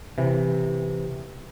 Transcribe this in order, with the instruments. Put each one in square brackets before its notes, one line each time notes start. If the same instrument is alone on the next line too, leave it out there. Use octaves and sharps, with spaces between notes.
[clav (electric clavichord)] C3 E3